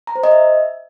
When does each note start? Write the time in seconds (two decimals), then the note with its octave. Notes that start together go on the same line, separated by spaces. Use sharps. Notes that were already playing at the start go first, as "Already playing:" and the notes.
0.07 A#5
0.15 C5
0.24 D#5
0.32 E5